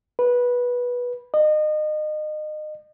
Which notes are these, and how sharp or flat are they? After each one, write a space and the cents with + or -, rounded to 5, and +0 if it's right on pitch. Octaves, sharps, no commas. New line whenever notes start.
B4 -15
D#5 -30